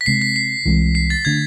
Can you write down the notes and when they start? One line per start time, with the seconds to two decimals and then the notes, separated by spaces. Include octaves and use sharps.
0.01 B6
0.06 C3 G#3 C4 C7
0.22 B6
0.36 C7
0.66 C2 C3 E3 G#3
0.95 C7
1.10 A6
1.25 D3 A3 D4 G#6